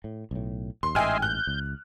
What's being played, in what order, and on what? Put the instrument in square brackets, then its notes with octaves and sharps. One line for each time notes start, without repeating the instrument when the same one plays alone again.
[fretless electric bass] A2
B1 A2
[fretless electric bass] D#2 [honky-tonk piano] C6
[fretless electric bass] A1 G#2 [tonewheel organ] D#5 E5 C6 [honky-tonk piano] G5 G#5 F6
[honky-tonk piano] F#6 [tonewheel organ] G6
[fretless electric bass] C#2